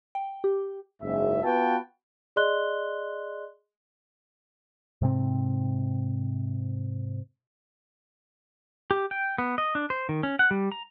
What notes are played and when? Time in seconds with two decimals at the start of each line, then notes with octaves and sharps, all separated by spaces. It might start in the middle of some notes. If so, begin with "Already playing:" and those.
0.15 G5
0.44 G4
1.02 F#1 G#2 E5
1.43 B3 F4 F#4 B4 G5 A5
2.36 G#4 D5 D#5 C6 F#6 G7
5.01 G#2 C3 C4
8.91 G4
9.11 G5
9.38 B3
9.58 D#5
9.75 D4
9.90 C5
10.09 D#3
10.23 C#4
10.39 F#5
10.51 G3
10.72 A#5